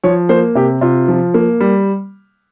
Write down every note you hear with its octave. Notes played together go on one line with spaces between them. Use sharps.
F3 C#5
A#3 C5
C3 G4
C3 F4
F3
A#3
G3